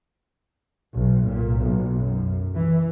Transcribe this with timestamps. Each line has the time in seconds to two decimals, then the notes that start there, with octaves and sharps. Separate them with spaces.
0.95 B1
1.26 A#2
1.59 B1
1.99 F#2
2.55 E3